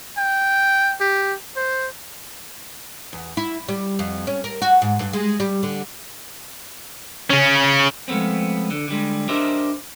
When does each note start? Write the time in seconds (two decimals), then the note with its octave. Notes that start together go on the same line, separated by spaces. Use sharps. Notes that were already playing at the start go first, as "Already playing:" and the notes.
0.17 G5
1.00 G4
1.56 C5
3.13 E2
3.37 E4
3.69 G3
3.99 F2
4.27 C#4
4.44 A#4
4.62 F#4
4.82 G#2
4.99 G2
5.13 G#3
5.40 G3
5.63 D3
7.30 C#3 C#4
8.08 F3 G#3 A3 B3 C4
8.70 D3
8.88 D3 G3 G#3
9.29 D4 G4 A#4 C5 D#5 E5